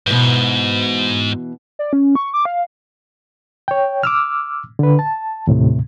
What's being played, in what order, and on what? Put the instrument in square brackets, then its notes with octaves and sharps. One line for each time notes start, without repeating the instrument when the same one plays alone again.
[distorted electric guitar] G#2 [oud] B2 E3
[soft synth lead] D5
C#4
C#6
D6
F5
[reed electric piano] C#5 G5
D6 E6 F6
D3 B4
A5
D#2 A2 C3